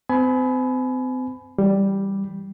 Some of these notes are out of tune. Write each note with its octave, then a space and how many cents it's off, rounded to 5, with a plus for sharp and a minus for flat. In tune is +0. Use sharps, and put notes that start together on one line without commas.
C4 -40 G#5 +30 B5 +15
E3 +0 G3 +0